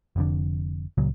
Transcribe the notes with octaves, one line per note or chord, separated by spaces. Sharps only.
F1 F2 D3
C#2 A#2 C#3 F#3